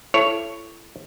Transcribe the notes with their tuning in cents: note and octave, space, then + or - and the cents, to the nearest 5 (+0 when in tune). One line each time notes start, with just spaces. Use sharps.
E4 +35 A4 +0 C#5 +5